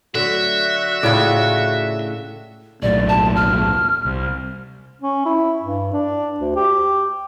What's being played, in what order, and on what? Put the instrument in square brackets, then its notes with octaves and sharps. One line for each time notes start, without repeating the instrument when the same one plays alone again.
[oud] D3 F#3 A3 [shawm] F#4 [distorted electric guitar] E5
[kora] A2 C#3 D5 [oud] D4 F4
[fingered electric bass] D#1 B1 A2 [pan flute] D5
[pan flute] A5
F6
[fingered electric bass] C2
[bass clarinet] C#4
E4
G2
D4
D2
G4